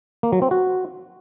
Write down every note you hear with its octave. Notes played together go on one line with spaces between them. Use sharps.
A#3
F#3
C4
F#4